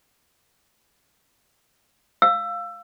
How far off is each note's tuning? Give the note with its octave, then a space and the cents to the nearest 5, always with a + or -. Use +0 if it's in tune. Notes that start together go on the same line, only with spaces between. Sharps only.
F5 +0 E6 +20